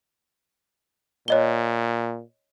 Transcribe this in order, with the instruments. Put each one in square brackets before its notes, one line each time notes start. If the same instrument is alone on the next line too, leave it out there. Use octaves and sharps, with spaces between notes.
[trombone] A#2 [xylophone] C#5 D#5 G7